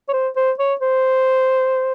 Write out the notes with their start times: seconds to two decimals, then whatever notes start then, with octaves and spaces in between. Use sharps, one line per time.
0.09 C#5
0.13 C5
0.36 C5
0.59 C#5
0.81 C5